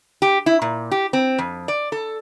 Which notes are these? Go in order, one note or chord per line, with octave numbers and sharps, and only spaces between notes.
G4
E4
A#2
G4
C4
F2
D5
A4